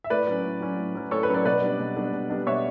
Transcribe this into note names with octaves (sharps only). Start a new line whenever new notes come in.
E5
A2 B4 D5
F#3 C#4
A2
F#3 C#4
A2
F#3 C#4
A2 A4 C#5
B4
F#3 C#4
B4 D5
B2 B4 D5
G3 B3 D4
B2
G3 B3 D4
B2
G3 B3 D4
B2 C#5 E5